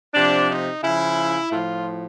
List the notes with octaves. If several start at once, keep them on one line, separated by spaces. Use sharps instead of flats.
C3 F3 D4
D#4
C#3 F3 E4
A2 F3 F4